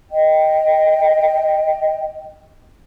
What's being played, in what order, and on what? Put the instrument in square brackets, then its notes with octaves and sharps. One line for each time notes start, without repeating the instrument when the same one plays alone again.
[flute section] D#5 G5